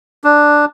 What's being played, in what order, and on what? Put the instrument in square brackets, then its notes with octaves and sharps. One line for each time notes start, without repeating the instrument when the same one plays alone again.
[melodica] D4